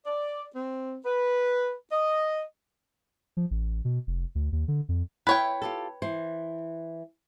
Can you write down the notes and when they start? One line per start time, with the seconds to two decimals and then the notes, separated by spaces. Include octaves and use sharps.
0.06 D5
0.56 C4
1.05 B4
1.91 D#5
3.37 F3
3.51 A1
3.85 B2
4.07 F1
4.35 D2
4.52 D#2
4.68 D3
4.89 F2
5.27 E4 B4 C#5 G5
5.62 F4 G4 A4
6.02 E3 C5